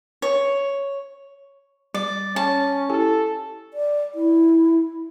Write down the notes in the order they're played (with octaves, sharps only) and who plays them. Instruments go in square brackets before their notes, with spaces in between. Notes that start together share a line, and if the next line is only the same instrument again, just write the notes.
[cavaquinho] C#5
[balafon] G3 [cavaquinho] D5
[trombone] C#4 [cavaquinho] A5
[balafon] E4 G4 G#5 [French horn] A4
[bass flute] D5
E4